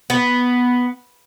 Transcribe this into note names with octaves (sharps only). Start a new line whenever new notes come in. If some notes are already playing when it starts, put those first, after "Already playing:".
B3